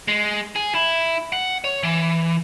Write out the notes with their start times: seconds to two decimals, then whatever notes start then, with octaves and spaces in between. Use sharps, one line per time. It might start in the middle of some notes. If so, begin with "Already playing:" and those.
0.08 G#3
0.56 G#4
0.75 E4
1.32 F#5
1.64 C#5
1.83 E3